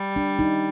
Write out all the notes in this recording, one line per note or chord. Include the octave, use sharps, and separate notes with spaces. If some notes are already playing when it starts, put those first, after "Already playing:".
Already playing: G3
D4
D#4